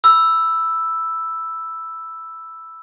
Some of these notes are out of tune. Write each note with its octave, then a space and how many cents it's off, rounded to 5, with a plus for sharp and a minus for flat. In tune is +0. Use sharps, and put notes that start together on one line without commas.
B5 +0 E6 +0